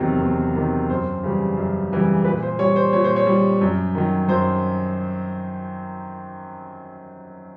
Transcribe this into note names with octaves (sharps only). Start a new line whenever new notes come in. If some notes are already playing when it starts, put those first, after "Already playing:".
Already playing: E2 C3 D#3 F#3 C5
E2
C3 D#3 F#3
F#2 C5
C#3 E3 G3
F#2
C#3 E3 G3
A#2 B4
C5
G3 C#5
C5
A#2 C#5
C5
C#5
G3
F#2
D#3 F#3
F#2 C5